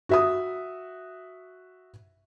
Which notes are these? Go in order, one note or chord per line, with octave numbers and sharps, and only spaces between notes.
F#4 E5 D#6